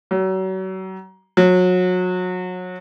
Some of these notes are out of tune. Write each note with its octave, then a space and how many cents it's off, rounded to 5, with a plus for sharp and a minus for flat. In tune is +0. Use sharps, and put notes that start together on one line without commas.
F#3 +35
F#3 -25